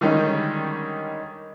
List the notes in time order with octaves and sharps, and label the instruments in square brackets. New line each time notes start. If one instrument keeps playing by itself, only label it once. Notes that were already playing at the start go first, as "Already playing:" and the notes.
[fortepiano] D3 D#3 G3 G#3 C#4 D#4